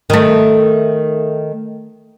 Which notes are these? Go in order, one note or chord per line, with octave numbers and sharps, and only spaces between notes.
D#3 A3